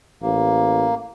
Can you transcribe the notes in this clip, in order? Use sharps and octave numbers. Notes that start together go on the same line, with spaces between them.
A1 A#3